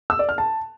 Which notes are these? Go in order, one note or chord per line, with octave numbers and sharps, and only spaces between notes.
E6
D5
F6
A5